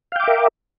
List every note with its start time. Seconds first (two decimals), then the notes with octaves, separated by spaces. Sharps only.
0.12 F5
0.16 G5
0.20 D6
0.24 E5
0.27 A#4